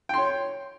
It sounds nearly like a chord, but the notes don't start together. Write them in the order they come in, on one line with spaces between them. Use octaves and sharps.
G5 C6 C#5